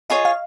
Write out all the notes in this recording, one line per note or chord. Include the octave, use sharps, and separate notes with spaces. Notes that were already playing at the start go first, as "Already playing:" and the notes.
F4 G#4 C#5 D#5
F5